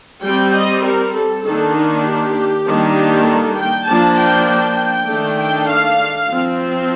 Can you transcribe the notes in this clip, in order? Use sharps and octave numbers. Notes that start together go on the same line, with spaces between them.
G3 C4 G5
D#5
A#4
A4
D#3 A#3 D4 A4
D#4
G4
D#3 G3 A#3 D4
G4
A4
G5
F3 A#3 D4 A5
G5
G5
D#3 A3 D4
G5
F5
F3 C4